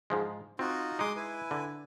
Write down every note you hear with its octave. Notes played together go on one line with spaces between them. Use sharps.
G#2 F3 G#3
C4 D#4 F4 F#4
G#3 D#4 C6 D6 D#6
E4 B4 G#5
D3